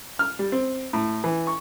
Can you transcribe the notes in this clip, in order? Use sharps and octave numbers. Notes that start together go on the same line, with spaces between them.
F6
G3
C4
A2
E3
C#6